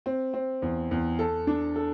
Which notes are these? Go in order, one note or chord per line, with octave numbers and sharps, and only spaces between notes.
C4
C4
E2
E2
A4
D4
A4